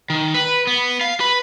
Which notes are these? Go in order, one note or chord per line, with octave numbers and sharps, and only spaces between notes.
D#3
B4
B3
F5
B4